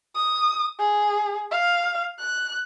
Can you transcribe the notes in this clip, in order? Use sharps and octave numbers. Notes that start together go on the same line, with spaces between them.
D#6
G#4
F5
F#6